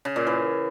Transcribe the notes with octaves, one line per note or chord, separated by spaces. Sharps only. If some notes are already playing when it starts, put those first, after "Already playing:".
C#3
A#2
E3